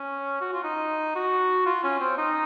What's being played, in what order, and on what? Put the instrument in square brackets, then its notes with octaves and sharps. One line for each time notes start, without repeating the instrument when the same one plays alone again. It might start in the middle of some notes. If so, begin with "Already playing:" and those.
Already playing: [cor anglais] C#4
F#4
F4
D#4
F#4
F4
C#4
C4
D#4